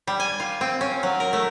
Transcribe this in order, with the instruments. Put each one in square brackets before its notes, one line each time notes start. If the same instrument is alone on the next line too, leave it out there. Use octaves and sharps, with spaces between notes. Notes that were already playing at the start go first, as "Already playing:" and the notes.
[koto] G3
G#5
F4
C4
C#4
F#3
A#4
A3